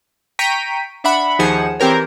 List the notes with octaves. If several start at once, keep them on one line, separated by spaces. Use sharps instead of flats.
G5 A#5 C#6 B6 D7 D#7
D4 E5 F#5 B5
D#2 F3 D#4 G#4 F#5 E7
E3 C4 G4 A#4 C#5